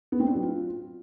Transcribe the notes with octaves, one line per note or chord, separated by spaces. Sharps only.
B3
C4
D4
F#3
F4